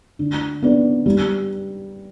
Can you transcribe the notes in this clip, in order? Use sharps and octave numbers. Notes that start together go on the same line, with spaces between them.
D3
B3 D4 B4 D5
G3